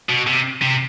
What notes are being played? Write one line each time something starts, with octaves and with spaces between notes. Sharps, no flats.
B2
C3
C3